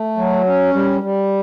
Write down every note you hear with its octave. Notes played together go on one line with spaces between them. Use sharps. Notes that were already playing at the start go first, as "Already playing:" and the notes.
Already playing: A3
F#3
C#4
G3
G3